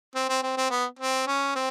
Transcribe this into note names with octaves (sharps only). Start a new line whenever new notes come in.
C4
C4
C4
C4
B3
C4
C#4
C4